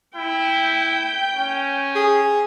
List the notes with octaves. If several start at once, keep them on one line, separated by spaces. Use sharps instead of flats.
E4 G5
C#4
G#4